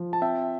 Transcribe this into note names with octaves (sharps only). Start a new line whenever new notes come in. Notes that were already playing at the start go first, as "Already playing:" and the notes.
Already playing: F3
A5
C4 E5 G5